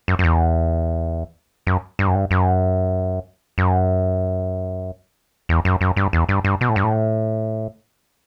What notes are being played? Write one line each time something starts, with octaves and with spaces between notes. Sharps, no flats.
F#2
F#2
E2
F#2
G2
F#2
G2
F#2
F#2
E2
F#2
F#2
G2
E2
G2
G2
B2
A2
G2
A2